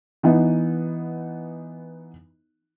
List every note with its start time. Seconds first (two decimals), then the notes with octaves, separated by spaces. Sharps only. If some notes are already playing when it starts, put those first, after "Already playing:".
0.23 E3 B3 D#4